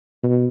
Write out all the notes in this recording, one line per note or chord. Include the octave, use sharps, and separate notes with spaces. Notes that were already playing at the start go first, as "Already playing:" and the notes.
B2